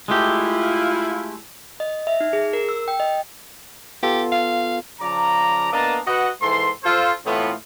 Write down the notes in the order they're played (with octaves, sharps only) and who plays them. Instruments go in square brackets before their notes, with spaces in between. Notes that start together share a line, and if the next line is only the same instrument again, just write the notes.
[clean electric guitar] G#3 A3 G4 [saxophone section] E4 F4
[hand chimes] D#5
E5
D#4
G#4
A#4
E6
G5
D#5
[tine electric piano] B3 F4 A4 [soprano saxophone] G4
[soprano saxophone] F5
[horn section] C#3 F3 D5 A#5
A#3 B3 D4 D#5 A5 A#5
F#4 B4 D#5 F#5
G#2 E3 A4 C6
F4 A4 C5
A2 E3 A3 B3 C4 F4